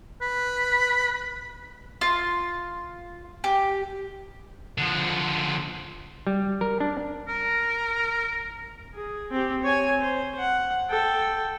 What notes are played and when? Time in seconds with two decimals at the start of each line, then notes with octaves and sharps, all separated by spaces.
0.21 B4
2.01 F4
3.44 G4
4.78 D3 F3
6.27 G3
6.61 A#4
6.80 D4
7.28 A#4
8.94 G#4
9.31 C4 G4
9.63 C#5 G#5
10.01 C5
10.39 F#5
10.90 A4 G5